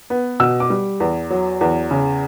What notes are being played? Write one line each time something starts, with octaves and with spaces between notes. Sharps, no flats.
B3
B2 E6
D6
G3
E2
F#3
E2
C#3